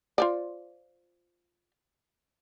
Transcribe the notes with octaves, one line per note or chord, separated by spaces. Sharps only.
F4 C5 D5